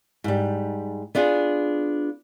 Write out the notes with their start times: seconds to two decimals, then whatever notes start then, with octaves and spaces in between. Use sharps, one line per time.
0.24 G#2 G3
1.15 B3 D4 F4 G#4